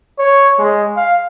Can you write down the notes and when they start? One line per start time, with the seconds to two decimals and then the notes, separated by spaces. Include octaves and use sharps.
0.19 C#5
0.59 G#3
0.96 F5